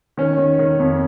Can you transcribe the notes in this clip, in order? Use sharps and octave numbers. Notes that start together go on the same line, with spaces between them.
D#3 C#4
D#3
D#3
F2